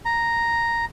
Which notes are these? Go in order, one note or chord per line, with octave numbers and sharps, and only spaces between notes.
A#5